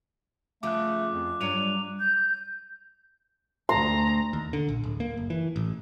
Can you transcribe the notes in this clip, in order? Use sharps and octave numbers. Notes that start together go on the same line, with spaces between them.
C#3 F3 A3 D6 F#6
F2
G2 F#3 D4 C#5 D#7 F7
G6
D2 A#5 C6
D#2
D3
A#1
D1
A#3
F#1
E3
A1